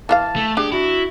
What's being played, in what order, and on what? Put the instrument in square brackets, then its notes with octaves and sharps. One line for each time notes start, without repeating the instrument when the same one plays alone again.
[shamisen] E3 F4 F5 [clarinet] A5
[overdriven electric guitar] A3
[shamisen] D4 [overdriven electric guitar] G4 [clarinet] G#4
[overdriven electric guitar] E4 [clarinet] F#4